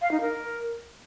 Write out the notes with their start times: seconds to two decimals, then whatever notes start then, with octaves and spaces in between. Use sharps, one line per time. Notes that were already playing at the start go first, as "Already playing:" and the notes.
0.02 F5
0.11 D#4
0.21 A#4